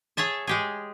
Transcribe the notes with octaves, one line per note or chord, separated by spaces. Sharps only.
G#4 C#5 E5 A5
G#3 G4 G#4